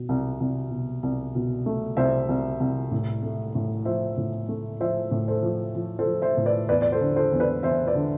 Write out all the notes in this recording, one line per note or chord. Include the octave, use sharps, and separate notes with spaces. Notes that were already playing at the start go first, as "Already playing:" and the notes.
Already playing: B2
C2
C2
B2
C2
B2
A3
C2 C5 E5
C2
C2
A2
A3
A2
F3 C5 E5
A2
A3
F3 C5 E5
A2
A4 C5
F3
F3
A4 C5
F3
C5 E5
A2
B4 D5
E2 B4 D5
D5
A4 C5
D3
A4 C5
E2
B4 D5
E2 C5 E5
B4 D5
D3